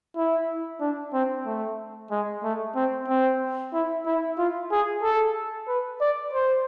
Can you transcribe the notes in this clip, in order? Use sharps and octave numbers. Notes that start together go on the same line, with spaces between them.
E4
D4
C4
A3
G#3
A3
C4
C4
E4
E4
F4
G#4
A4
B4
D5
C5